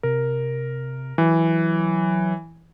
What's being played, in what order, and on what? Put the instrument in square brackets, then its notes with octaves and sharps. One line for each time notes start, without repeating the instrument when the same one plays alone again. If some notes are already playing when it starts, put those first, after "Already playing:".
[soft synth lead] C3 [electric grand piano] A#4
[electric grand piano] E3 [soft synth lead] F#3